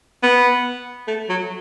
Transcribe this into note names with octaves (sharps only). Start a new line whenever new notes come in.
B3
A3
F#3